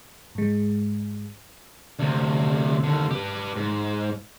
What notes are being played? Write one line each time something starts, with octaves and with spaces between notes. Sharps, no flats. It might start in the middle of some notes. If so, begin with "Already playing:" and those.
G#2 G#3
D2 C3
D#2 D3
G4 B4
G#2